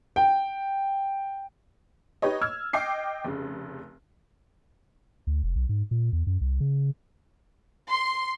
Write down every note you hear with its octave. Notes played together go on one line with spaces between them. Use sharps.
G5
D#4 G4 B4 C#5 D#5
E6 F6 G#6
D#5 G5 D6 C7
F1 C#3
D2
F1
B1
G#2
A#2
E2
F#2
C2
C#3
C6